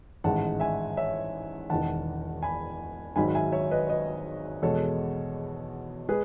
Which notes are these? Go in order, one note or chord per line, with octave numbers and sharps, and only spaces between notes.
A1 G#2 D#3 G#3 F#5 A5
E5 G#5
C#5 E5
E1 E2 D#3 F#5 A5
G#5 B5
G#1 G#2 D#3 F#3 G#5 B5
E5 G#5
C#5 E5
B4 D#5
B4 D#5
E2 B2 G#3 A4 C#5
G#3 G#4 B4